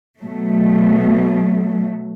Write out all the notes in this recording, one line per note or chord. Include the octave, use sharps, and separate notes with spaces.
B2 F#3 A3